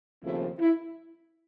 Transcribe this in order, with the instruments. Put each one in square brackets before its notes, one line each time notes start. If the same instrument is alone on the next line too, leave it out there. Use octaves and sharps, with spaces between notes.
[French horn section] D#2 C#3 F3 A3 C4 E4
E4